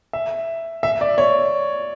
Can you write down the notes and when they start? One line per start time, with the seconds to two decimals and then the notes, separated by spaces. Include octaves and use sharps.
0.13 E5
0.83 E5
1.01 D5
1.18 C#5